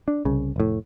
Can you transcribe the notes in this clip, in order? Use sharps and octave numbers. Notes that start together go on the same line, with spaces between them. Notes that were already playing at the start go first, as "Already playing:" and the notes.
D4
C2 C#3
F1 A2